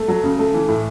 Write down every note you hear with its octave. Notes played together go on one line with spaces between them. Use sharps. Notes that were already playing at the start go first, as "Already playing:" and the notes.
Already playing: A3
F#3
C#3
A3
E3
A2